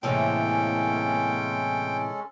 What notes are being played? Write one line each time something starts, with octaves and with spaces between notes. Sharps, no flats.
A2 C3 E3 G#3 A#3 C#4 A4 G5